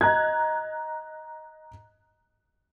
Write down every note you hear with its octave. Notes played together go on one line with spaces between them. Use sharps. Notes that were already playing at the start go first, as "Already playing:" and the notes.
D#5 A#5 F#6 G#6